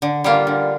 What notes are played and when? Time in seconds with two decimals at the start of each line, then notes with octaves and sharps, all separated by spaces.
0.02 D3
0.24 G3 A#3 F4
0.47 D3